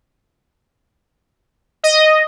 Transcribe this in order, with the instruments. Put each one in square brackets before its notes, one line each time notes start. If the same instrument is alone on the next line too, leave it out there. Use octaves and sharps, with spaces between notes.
[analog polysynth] D#5